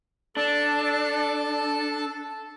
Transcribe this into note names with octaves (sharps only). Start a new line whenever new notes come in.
D4 A4 A5